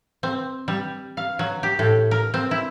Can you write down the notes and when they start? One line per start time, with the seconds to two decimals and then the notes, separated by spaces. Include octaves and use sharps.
0.23 C4
0.68 G3
1.17 F5
1.39 F#3
1.63 G4
1.79 A2
2.11 A#4
2.34 C4
2.51 E4